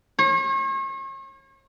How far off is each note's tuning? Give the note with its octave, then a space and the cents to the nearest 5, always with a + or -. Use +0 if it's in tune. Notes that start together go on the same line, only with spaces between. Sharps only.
C#5 -40